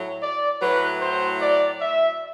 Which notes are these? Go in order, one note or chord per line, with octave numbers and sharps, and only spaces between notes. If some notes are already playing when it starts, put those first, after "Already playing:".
Already playing: A2 F#3
D5
A2 F#3 B4
C5
D5
E5